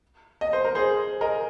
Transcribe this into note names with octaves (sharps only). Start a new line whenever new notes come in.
D#5
C5
A#4
G#4 C5
A#4 D#5